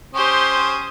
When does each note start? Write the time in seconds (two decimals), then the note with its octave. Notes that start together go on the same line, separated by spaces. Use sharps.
0.15 C#4 G4 C5 C6 D#6